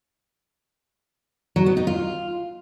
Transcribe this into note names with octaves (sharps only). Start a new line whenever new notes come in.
F#3
B3
D#4
F4